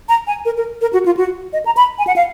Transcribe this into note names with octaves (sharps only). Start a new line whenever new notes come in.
A#5
G#5
A#4
A#4
A#4
F#4
F4
F#4
D#5
A#5
B5
G#5
F#5
F5